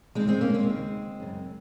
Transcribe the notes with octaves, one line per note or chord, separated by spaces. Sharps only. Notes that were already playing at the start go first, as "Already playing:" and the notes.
D#2 C#3 G#3 C4
G#3 C4
A#3 C#4
G#3 C4
D#2 C#3
F#2 C#3